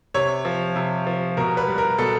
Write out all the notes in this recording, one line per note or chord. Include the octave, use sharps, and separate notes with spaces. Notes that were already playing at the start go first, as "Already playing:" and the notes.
C3 C#5
F3
C3
F3
B2 A#4
B4
G3
A#4
B2 A4